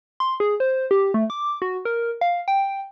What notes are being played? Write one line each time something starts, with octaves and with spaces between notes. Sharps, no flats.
C6
G#4
C5
G4
A3
D6
F#4
A#4
F5
G5